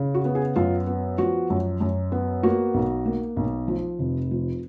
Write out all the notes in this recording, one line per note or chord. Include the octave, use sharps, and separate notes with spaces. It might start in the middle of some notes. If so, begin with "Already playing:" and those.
Already playing: C#3
F#4
B3
G#4
F#2 F4
B3
F3 F#4
F#2
F#2
B3
A#3 F#4
B1
A#3
B1
F3
F1
F3